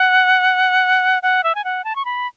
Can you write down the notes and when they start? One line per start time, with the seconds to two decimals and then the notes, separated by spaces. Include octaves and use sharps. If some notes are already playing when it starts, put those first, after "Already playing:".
Already playing: F#5
1.23 F#5
1.44 E5
1.55 G#5
1.64 F#5
1.84 A5
1.96 C#6
2.05 B5